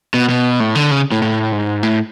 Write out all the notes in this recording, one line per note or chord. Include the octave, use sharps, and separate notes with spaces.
B2
B2
A2
D3
C#3
A2
A2
G#2
A2